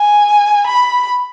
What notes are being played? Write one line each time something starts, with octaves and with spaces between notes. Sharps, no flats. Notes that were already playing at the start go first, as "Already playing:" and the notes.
Already playing: G#5
B5